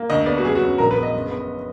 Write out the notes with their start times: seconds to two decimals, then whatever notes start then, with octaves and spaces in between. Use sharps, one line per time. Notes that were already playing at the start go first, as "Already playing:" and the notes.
Already playing: A#3
0.10 D2 D#5
0.26 B3 D5
0.38 F#4
0.45 F#2 G#4
0.55 F#4
0.61 F#2
0.78 A#1 A#4
0.91 B4
0.97 B3
1.03 D#5
1.14 F#1
1.31 B3